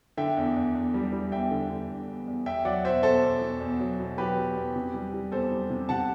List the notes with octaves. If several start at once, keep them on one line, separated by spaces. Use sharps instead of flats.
D3 E5 G5
E2
E2
E2
G3
G3
E2 E5 G5
D3
D3
E2
E2
E2
E2 E5 G5
F#3 D5 F#5
B2 C5 E5
B2 A4 C5
E2
B2
E2
F#3
B2
F#3 G4 B4
F#3
E2
C3
G3
G3
E2 A4 C5
G3
C3
C3 F#5 A5